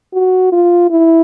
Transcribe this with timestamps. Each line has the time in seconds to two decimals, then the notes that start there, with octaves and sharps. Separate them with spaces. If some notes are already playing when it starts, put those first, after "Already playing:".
0.14 F#4
0.52 F4
0.91 E4